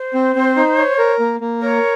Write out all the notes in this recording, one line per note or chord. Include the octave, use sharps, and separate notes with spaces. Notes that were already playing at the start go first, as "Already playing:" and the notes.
Already playing: C5
C4
C4
D#4
C#5
A#4
A#3
A#3
A#4 C#5